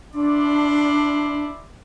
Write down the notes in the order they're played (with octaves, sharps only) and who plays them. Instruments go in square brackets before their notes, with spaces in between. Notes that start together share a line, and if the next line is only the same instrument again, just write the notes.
[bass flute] D4 [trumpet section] E4 D5 C6